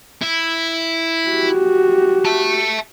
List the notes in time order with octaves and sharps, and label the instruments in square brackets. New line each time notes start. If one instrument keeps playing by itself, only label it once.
[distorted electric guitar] E4
[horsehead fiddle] F#4 G4
[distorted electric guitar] E5 A5